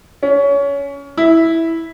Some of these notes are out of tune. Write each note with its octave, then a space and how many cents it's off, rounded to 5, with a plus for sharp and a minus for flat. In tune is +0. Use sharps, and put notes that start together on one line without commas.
C#4 +20
E4 -5